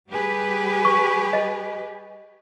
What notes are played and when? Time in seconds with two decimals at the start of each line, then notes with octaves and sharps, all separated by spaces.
0.12 G3 G4 G#4 B4
0.85 C#6
1.33 D#5